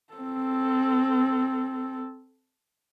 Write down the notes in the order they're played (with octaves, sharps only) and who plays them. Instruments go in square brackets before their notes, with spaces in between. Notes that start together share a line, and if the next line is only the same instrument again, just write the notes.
[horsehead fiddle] C4 A4